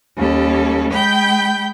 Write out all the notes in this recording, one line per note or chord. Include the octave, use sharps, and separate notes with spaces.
D#2 G3 C#4 A4
G#3 G5 B5 G6